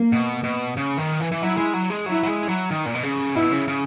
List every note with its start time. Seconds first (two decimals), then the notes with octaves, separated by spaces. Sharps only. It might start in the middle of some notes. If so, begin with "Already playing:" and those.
Already playing: A#3
0.12 B2
0.44 B2
0.77 C#3
0.98 D#3
1.20 E3
1.32 E3
1.41 F#3 E4
1.57 G#3
1.74 F#3
1.90 G#3
2.06 F#3 E4
2.23 F#3
2.27 G#3
2.49 F#3
2.71 D#3
2.86 A#2
2.94 B2
3.03 C#3
3.35 B2 E4
3.52 C#3
3.68 C#3